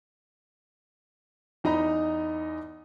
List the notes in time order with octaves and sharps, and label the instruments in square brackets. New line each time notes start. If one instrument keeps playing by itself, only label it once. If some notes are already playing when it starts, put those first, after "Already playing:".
[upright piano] E2 D#4 D#5 A#5 B5